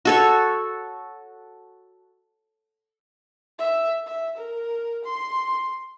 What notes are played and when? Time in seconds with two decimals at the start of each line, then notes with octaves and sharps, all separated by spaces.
0.05 F#4 A4 C#5
3.59 E5
4.06 E5
4.37 A#4
5.05 C6